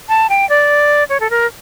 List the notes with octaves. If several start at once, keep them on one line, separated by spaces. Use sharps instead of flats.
A5
G5
D5
C#5
A4
A#4